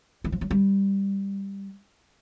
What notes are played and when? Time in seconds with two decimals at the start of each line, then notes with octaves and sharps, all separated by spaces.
0.24 E3
0.32 F3
0.41 F#3
0.51 G3